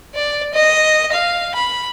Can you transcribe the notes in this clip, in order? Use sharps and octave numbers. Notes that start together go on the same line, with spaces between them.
D5
D#5
F5
B5